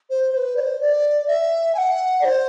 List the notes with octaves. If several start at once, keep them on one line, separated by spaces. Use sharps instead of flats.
C5
C5
B4
D5
C5
D5
E5
G#5
F#5
D5
C5